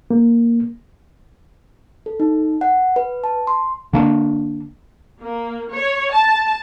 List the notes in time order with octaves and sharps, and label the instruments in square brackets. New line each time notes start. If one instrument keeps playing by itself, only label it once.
[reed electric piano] A#3
[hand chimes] A4
D#4
F#5
B4
A5
C6
[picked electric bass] D3 A#3 D4
[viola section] A#3
C#5
A5